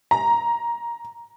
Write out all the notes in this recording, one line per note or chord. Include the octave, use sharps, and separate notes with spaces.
A#5